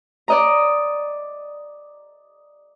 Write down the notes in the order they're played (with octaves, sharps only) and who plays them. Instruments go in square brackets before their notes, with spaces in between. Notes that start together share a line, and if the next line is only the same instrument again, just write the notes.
[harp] D5 D#5 A#5